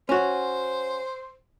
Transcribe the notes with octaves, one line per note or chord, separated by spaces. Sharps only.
C#4 F#4 C5